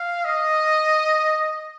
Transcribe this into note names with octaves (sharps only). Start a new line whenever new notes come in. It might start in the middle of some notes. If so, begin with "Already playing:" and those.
Already playing: F5
D#5